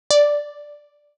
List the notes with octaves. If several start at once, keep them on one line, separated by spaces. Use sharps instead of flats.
D5